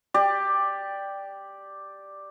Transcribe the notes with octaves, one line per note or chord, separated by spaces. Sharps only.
G4 D5